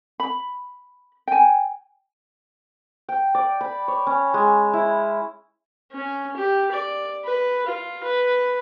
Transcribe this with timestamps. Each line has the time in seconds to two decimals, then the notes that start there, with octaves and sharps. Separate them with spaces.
0.20 B5
1.28 G5 G#5
3.09 G5
3.35 D5
3.61 B5
3.88 C#5
4.07 C#4
4.34 G#3
4.73 E4
5.92 C#4
6.36 G4
6.72 D5
7.24 B4
7.66 F4
8.04 B4